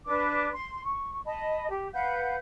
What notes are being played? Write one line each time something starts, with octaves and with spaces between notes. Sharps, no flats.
D4 B4 D6
C6
C#6
D#5 A5 B5
G4
B4 F5 F#5 G6